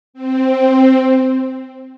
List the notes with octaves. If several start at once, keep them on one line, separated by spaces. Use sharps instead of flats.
C4